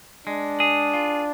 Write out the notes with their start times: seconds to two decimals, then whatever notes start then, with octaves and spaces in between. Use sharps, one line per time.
0.27 G#3 D4
0.60 G#4
0.94 F4